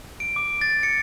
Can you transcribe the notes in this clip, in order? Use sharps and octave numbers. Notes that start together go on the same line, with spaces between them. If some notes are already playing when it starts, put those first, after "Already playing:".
D7
D6
A6
C#7